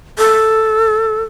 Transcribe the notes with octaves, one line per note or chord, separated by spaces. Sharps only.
A4